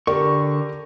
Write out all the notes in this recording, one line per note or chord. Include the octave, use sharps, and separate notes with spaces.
D3 G4 A#4 D5 C#6